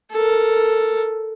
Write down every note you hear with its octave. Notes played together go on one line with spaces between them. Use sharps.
A4 A#4